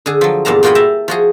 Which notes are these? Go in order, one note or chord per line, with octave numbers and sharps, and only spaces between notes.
D3 G#4
F3 F#3
E2 G2 A#2 A5 A#5
A#2 F4 F#4 G#4 G5 B5
E5 G5 A5 A#5
F3 F#4 G#4